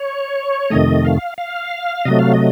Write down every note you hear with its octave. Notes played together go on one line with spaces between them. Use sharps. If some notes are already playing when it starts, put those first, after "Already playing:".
Already playing: C#5
F2 C3 D#3 A3 D#5
F5
F5
C3 F#3 A3 D#5
F5
D#5